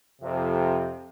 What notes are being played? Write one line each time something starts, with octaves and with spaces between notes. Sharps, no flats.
F2 C3